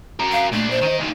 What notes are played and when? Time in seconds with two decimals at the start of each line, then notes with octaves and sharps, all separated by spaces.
0.20 F#4 A#4
0.32 F5
0.53 A#2 A3 D4
0.71 C5
0.83 D#3 D#5
1.00 D2 D#3